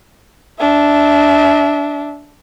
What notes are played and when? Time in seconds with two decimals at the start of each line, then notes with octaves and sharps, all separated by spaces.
0.59 D4 E5